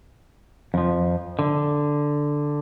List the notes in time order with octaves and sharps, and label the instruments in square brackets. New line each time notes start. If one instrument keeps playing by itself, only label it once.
[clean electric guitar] F2 F3
D3